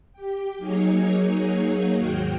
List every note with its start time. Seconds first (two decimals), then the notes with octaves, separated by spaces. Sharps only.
0.13 G4 G5
0.57 F#3 A#3 D#4 G#4 C#5
1.94 D#2 G#2 F#4 G5 F6